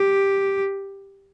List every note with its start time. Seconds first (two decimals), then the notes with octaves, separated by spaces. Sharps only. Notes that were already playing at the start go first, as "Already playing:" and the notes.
Already playing: G4